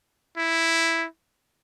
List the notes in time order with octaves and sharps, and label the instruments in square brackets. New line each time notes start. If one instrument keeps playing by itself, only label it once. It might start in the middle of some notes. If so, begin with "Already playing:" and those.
[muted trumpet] E4